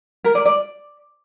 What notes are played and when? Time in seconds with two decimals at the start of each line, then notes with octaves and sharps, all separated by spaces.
0.25 A#4
0.35 D5
0.45 D5